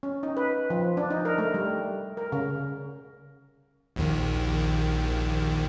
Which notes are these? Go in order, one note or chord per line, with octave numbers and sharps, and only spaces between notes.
C#4
D#4
B4
F3
D4
D#4
A#4
A3
G3
A#4
C#3
A#1 D#2 D#3